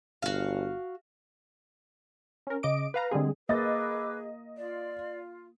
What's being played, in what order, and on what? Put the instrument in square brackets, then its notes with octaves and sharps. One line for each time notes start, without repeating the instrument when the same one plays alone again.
[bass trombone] G1 [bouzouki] F#4 F5
[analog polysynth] C#4 A#4
C#3 D#5 D6 D7
B4 F5 A#5
D3 G3 G#3 C4 G#4
[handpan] A#3 [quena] G#4 [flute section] B4 D6 E6 [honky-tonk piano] D#5 A6
[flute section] F4 [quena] D5